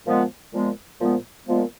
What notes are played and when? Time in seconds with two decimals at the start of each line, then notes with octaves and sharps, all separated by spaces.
0.06 A#2 F3 G#3 B3
0.53 A#2 F3 G#3 B3
1.00 A#2 F3 G#3 B3
1.46 A#2 F3 G#3 B3